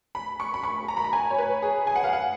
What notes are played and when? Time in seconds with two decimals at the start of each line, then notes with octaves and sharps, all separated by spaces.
0.15 B5
0.40 C#6
0.54 B5
0.63 C#6
0.88 A#5
0.97 B5
1.04 A#5
1.13 G#5
1.31 C#5
1.38 B4
1.62 G#4
1.87 G#5
1.96 F#5
2.04 F5
2.13 F#5